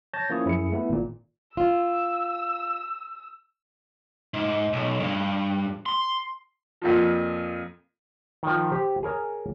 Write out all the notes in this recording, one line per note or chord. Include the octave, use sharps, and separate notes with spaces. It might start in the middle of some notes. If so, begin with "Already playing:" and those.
C#5 A5 G6 A6 A#6
F3 A#3 C#4 E4 C#5 D#6
F#2 E4 G#4 C#7
A3 B3 E4
G#1 A#2
F4 E6
G#2
B1
G2
C6
F2 A#2 F3
D#3 F3
G4 C5
G#4 A#4 C#5